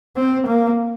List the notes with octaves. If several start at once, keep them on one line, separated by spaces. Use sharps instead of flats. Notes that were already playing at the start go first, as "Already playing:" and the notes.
C4
A#3